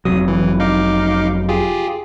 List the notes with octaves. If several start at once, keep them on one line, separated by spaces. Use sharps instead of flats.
F1 C3 F#3 D#6
E3
D#4 F5 D6
F4 G4 G#4